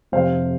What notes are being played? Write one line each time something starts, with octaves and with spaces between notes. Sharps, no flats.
F1 F2 C3 C5 F5